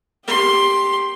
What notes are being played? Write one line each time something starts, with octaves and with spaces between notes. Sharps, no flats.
G4 C6